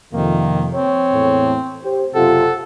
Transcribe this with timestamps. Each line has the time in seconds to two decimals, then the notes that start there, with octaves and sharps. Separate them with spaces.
0.13 F2 C3 D#3 A#3
0.74 C4 C#5
1.12 E2 A2
1.83 G4 C5
2.15 F#1 C3 F4 A4 F#5